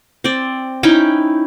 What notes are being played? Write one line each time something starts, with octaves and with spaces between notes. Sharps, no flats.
C4 D5
C#4 D#4 E4 G5